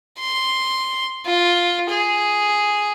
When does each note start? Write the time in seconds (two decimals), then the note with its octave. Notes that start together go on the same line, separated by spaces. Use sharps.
0.19 C6
1.26 F4
1.90 G#4